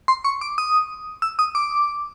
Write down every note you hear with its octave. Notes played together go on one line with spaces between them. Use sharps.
C6
C#6
D6
D#6
E6
D#6
D6